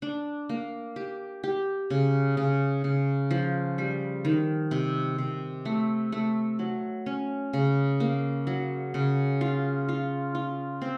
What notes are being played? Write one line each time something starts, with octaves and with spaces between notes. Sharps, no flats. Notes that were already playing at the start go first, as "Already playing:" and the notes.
D4
A#3
G4
G4
C#3
C#3
C#3
F3
G3
D#3
C3
C3
A3
A3
F#3
C#4
C#3
A#3
F#3
C#3
F4
F4
F4
C4